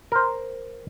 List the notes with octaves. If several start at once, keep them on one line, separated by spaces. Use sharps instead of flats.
A#4 C5